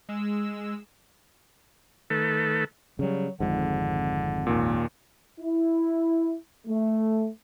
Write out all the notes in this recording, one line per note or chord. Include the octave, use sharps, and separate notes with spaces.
G#3 E6
D#3 A3 A4 B4
C#3 F#3 G3
G#1 F2 G#2 D3
D#2 A#2
E4
A3